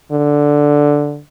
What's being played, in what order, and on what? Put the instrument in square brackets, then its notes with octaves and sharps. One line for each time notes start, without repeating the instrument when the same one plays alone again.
[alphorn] D3